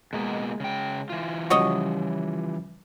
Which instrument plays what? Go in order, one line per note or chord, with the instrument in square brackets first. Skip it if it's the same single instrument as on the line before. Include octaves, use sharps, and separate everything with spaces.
[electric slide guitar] B2 A#3 D#5 [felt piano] G#3
[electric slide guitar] C#3 G5
E3 F4
[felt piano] C#3 F3 G3 [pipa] F#4 C#5 D#5